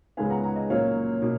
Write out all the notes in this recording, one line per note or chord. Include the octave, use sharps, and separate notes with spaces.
C#2 C#3 G#3 B3 F5 G#5
F#5 A#5
F#5 A#5
D#5
A#2 F#3 A#3 C#4 C#5 F5
B2 A#3